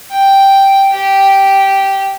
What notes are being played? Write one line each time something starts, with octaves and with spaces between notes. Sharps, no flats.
G5
G4